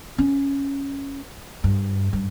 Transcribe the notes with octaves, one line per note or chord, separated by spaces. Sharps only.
C#4
G2
G2